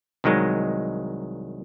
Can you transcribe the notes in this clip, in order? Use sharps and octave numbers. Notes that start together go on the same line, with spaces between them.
C2 D#3 F#3 G#3 D#4